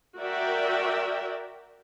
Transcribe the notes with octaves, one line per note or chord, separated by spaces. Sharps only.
F#4 A#4 D5 E5 G5